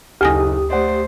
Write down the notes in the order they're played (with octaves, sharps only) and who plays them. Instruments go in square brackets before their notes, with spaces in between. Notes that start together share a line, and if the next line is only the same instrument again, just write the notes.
[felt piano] F#1 D#4 A4 [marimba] D2 G#5 A#6 [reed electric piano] G4 D#6
[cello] A3 C5 [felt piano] D5 F#5